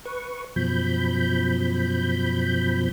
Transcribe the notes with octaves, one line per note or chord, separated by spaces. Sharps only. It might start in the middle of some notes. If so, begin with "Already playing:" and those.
B4 C#6
F#2 B2 F3 B5 G6